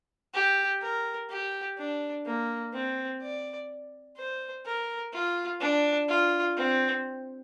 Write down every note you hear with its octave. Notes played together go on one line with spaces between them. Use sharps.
G4
A#4
G4
D4
A#3
C4
D5
C5
A#4
F4
D4
F4
C4